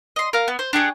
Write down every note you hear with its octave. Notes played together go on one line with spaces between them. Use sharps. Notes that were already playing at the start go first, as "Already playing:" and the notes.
D#5 C6
A#4 F5
B3
C5
D4 G4 G#4 C#6